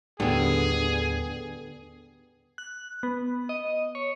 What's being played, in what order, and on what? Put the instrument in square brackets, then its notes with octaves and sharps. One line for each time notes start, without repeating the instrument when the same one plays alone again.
[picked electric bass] D#2 A2 A3 [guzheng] D3 [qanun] G3 B3 [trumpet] G#4
[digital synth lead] F#6
B3
D#5
C#5